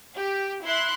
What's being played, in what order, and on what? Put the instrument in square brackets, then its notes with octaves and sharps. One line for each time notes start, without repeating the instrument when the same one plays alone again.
[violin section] G4
E4 E5 C6 F#6